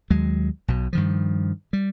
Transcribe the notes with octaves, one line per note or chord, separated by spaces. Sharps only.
D#2 F#3 G#3
B1 B2
G2 D#3 F3
G3